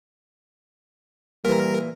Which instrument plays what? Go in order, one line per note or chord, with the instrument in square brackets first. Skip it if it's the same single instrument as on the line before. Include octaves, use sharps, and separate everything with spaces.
[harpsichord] A#2 E3 [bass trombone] G3 [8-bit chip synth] A#4